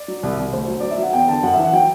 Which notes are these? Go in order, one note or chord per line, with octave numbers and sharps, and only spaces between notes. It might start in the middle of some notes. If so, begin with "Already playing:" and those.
Already playing: D5
F#3
C2
C2
D2 C5
F#3
F#3 D5
E5
F#3 F#5
E2 G5
D3 A5
F#2 F#5
E3 E5
F#5
F#3 G5